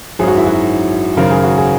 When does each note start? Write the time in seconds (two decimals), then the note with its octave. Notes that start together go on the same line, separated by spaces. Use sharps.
0.19 G#1 F#2 D#3 F#3 G#4
0.28 F#4
0.37 E4
0.47 F#4
1.17 G#1 F#2 C#3 A#4
1.31 G#4
1.44 F#4
1.58 G#4